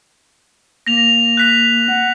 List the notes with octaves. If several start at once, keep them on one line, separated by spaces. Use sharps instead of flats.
A#3 A#6 F7
F#6 B6 F7
F#5